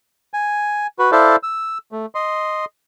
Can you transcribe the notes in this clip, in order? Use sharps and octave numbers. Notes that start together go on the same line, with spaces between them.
G#5
F#4 B4
E4 A4 C5 D5 E5 F5
E6
A3
D#5 C6